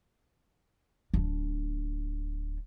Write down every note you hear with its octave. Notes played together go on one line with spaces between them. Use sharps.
D1 D4